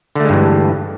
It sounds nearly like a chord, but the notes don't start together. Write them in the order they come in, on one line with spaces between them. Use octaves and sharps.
D3 A3 G#3 G2 E3